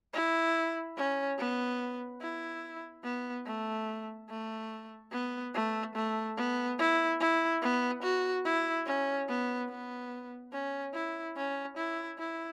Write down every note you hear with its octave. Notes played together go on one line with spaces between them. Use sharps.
E4
C#4
B3
E4
B3
A3
A3
B3
A3
A3
B3
E4
E4
B3
F#4
E4
C#4
B3
B3
C#4
E4
C#4
E4
E4